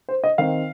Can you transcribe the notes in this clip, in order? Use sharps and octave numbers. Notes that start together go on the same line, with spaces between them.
C5
D#5
D#3 C4 F5